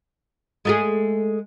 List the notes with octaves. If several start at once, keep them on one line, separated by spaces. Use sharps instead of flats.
G#3 A3 G#4